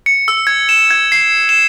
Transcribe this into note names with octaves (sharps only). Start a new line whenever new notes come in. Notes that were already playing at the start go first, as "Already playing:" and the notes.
C#7
E6
G#6
E7
G#6
C7
E7